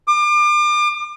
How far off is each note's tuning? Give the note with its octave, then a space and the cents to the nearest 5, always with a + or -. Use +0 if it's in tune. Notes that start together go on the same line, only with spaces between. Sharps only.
D6 +35